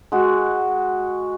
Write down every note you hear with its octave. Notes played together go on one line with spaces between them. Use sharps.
G#3 F#4